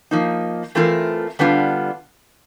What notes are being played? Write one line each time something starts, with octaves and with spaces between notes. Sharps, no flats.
F3 A#3 D#4
E3 A3 C4 F4 A#4
D3 G3 B3 D4 F4